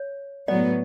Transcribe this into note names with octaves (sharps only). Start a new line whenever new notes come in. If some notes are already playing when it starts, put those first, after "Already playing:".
Already playing: C#5
A2 F#3 B3 D5